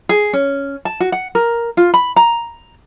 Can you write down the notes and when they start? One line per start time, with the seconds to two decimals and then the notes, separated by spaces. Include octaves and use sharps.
0.09 G#4
0.33 C#4
0.85 A5
1.00 F#4
1.12 F#5
1.35 A#4
1.77 F4
1.94 B5
2.16 A#5